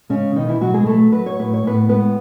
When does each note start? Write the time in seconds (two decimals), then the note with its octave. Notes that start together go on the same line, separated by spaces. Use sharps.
0.09 C#3 G#3 C#4
0.35 B2 D#3 D#4
0.48 E3 E4
0.61 B2 F#3 F#4
0.74 G#3 G#4
0.87 F#3 A3 A4
1.12 F#3 B4
1.26 C#5
1.38 A2 B4
1.54 C#5
1.63 A2 B3 B4
1.89 G#3 B3 B4